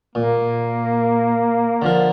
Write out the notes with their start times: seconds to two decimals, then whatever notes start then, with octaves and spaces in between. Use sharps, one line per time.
0.15 A#2 A#3
1.82 D3 F3 A#4